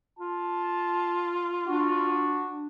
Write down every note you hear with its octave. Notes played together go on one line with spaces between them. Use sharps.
F4 A5
D4 F#4